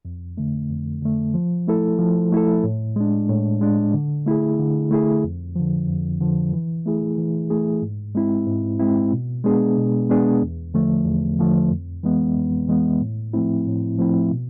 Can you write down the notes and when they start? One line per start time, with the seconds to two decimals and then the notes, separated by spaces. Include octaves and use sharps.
0.05 F2
0.37 D3 A3
0.70 F2
1.02 D3 A3
1.34 F3
1.68 A3 E4 A4
1.99 F3
2.32 A3 E4 A4
2.64 A2
2.96 G#3 D4
3.29 A2
3.61 G#3 D4
3.94 D3
4.26 A3 E4 G#4
4.59 D3
4.91 A3 E4 G#4
5.24 F2
5.56 D3 F3
5.87 F2
6.20 D3 F3
6.53 E3
6.86 A3 E4 G#4
7.18 E3
7.50 A3 E4 G#4
7.82 G#2
8.15 G#3 C4 E4
8.47 G#2
8.79 G#3 C4 E4
9.13 B2
9.44 G#3 B3 D4 G#4
9.77 B2
10.10 G#3 B3 D4 G#4
10.42 E2
10.74 D3 F3 A3
11.06 E2
11.39 D3 F3 A3
11.71 F2
12.03 E3 G#3 B3
12.37 F2
12.68 E3 G#3 B3
13.01 A2
13.33 F3 A3 C4 E4
13.66 A2
13.98 F3 A3 C4 E4
14.31 B2